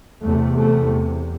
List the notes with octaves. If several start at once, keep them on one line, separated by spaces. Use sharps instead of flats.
E2 C3 A3
A3